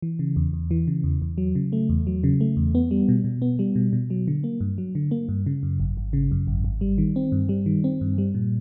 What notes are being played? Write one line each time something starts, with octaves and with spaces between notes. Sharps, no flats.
E3
C#3
E2
E2
E3
C#3
E2
E2
F#3
C#3
A3
E2
F#3
C#3
A3
E2
B3
G3
B2
B2
B3
G3
B2
B2
F#3
D3
A#3
G2
F#3
D3
A#3
G2
C#3
F#2
G#1
G#1
C#3
F#2
G#1
G#1
G3
D#3
C4
G2
G3
D#3
C4
G2
G3
A#2